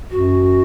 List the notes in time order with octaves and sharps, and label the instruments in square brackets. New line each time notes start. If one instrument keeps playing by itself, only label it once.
[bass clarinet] F#2 [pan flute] F#4